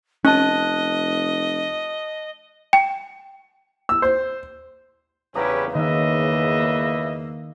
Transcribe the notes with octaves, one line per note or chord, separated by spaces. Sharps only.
F1 C#4 D#5 A5 F#6
G5
E6
C5
E2 C#3 C#4 E4 G4 B4 A#5 D#6
D#3 A#3 B4 D#5 E5